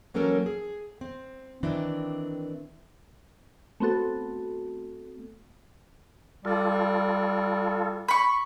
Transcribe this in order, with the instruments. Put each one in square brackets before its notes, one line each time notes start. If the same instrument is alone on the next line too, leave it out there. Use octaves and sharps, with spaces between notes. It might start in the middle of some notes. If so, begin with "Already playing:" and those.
[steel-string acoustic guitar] E3 F#3 A#3 C#4 A4 A#4
G#4
C4
D#3 E3 C4 D4
[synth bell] A3 B3 C4 F#4 A4
[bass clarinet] G3 [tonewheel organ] F4 A4
[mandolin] B5 C#6